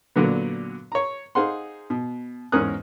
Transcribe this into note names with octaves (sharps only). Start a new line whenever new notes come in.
A#2 D3 F#3 B3
C#5 A#5
D#4 G#4 C5 F5 F#5 C6
B2
E2 G#2 C#4 A#4 D#6 F#6